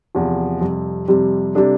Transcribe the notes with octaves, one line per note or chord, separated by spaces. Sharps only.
E2 C3 F3
F2 C3 G3
F2 C3 G3
C3 G3 D4 A4